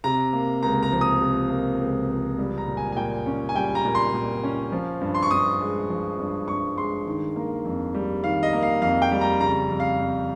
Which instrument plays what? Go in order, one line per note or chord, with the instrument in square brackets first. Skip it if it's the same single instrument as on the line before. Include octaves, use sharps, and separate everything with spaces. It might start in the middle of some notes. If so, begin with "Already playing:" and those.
[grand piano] C3 A#5
A#3
C#2 A#5
A#5
F3
D#6
C3
A#3
C#2
F3
G3
A#5
A#2
G#5
G#5
A#2 G5
C#4
G#5
G3 G5
A#5
A#2
C6
A#2
C#4
F3
G2
C6
C#6
G2 D#6
G#3
F3
G2
G2 C#6
G#3 C6
D#3
A#3
F2
G3
D#3 F5
D#5
A#3
F5
F2 F5
G5
G3
A#5
C#3 A#5
F2
F5
F2